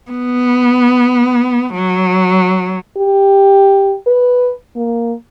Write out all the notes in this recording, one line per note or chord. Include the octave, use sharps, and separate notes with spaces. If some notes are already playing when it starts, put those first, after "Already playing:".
B3
F#3
G4
B4
A#3